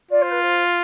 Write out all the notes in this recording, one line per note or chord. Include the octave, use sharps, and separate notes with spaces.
F4 D5
C5
B4
C5